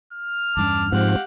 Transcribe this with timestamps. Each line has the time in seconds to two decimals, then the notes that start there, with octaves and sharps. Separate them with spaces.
0.13 F6
0.57 E2 G2 C#4 A5 D6
0.92 G#2 F3 G#3 C4 G4 F5 F#5